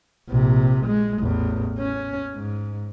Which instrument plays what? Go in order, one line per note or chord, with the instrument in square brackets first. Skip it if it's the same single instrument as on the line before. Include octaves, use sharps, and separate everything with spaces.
[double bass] A#1 C3
G#3
A1 E2
C#4
G#2